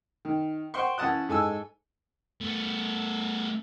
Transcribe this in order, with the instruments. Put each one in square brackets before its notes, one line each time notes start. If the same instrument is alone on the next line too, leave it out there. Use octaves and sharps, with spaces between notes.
[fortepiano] D#3
C5 F#5 G5 C6 C#6
E3 C#4 F#5 A5 D#6 F#6
G#2 A4 G#5 E6
[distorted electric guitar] A3 B3